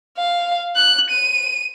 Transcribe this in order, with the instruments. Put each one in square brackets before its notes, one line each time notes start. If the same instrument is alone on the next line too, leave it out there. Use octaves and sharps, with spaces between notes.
[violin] F5
F#6
D#7